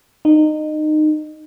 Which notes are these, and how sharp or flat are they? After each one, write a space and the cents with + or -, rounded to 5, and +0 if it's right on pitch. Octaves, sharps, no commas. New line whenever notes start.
D#4 -20